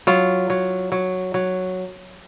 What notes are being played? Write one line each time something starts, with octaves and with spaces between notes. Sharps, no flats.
F#3 F4
F#3
F#3
F#3